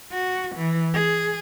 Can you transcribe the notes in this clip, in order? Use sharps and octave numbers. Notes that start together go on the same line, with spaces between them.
F#4
E3
G#4